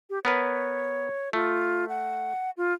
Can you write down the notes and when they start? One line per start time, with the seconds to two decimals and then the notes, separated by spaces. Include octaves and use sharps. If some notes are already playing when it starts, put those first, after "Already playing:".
0.10 G4
0.25 B3 A#4 B4 C#5
1.33 A3 F4
1.89 F#5
2.57 F4